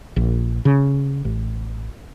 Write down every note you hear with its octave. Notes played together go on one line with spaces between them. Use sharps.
A#1
C#3
A1